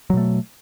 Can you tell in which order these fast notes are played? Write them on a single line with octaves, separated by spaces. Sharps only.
F#3 B2 A3